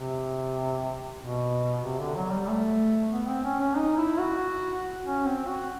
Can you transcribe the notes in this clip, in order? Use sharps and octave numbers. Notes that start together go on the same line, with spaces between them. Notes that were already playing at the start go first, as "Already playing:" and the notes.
Already playing: C3
B2
C3
D3
F#3
G3
A3
B3
C4
C#4
C#4
D#4
E4
F#4
C#4
C4
F#4